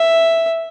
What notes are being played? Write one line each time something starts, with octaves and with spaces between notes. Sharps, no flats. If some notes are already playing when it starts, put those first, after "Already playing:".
Already playing: E5